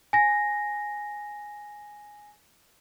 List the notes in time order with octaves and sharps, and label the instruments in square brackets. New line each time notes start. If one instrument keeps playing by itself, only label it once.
[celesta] G#5 A#6